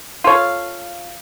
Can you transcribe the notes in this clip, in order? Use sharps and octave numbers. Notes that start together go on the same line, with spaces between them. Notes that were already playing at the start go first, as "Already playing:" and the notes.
F4 A4 C#5 F5